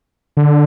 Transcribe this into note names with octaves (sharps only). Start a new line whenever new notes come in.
D3